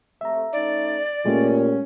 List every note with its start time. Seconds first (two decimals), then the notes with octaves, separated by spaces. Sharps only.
0.21 C3 A3 E5 A#5
0.53 A3 C#4 D#4 D5
1.26 A#2 G#3 A3 C#4 G4